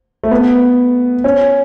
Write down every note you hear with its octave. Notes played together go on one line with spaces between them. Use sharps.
A3
B3
C#4